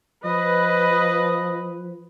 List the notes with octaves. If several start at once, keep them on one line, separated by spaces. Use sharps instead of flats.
F3 B4 D#5